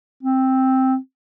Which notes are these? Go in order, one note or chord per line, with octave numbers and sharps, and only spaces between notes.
C4